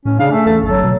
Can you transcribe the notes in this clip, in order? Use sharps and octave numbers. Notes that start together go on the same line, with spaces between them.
A2 C#4
C#3 D4 F5
A3 C#4
E2 A4
G1 F#3 A4
B2